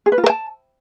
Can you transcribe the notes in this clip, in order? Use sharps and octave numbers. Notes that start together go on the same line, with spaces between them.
G#4
B4
F4
A#4
A5